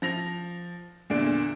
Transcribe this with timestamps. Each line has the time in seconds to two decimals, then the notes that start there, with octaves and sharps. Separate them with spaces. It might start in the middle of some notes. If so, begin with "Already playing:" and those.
0.02 F3 A#6 F7
1.10 E2 A#2 D3 D5 D7